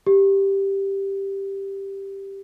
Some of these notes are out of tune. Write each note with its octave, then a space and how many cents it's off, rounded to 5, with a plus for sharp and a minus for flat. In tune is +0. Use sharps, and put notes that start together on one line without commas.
G4 +0